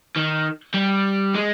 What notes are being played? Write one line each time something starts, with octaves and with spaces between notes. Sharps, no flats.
D#3
G3
G#3